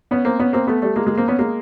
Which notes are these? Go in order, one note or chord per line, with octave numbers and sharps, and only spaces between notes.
B3 C#4
A#3 C4
B3 C#4
A#3 C4
A3 B3
G3 A3
G#3 A#3
G#3 A#3
A#3 C4
B3 C#4
G#3 A#3